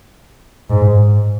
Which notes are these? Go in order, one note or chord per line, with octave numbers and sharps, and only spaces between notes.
G#2